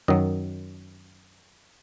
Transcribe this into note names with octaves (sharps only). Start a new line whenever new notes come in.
F#2 D#3 F#3 D#5